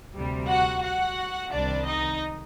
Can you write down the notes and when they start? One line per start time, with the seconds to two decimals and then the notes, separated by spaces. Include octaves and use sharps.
0.13 D2 C3 G3
0.47 F#4 F#5
0.82 F#4 F#5
1.51 C2 C3 D#3 G3 D4 D5
1.86 D#4 D#5